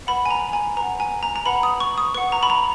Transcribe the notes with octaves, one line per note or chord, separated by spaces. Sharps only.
B4 F#5 B5
G#5
A#5
G#5
B4 F#5 A#5
G#5
A#5
A#5
B4 F#5 B5
D#6
C#6
D#6
B4 F#5 C#6
A#5
B5
A#5